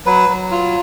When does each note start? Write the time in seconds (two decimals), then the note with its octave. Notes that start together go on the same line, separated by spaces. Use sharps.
0.06 F#3 B4
0.29 F#3
0.51 F4